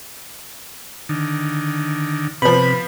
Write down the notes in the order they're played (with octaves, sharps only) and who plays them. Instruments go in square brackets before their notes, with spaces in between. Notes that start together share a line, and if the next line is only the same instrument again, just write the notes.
[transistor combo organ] D3 D#3
[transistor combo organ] C3 [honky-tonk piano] F3 B3 [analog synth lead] B5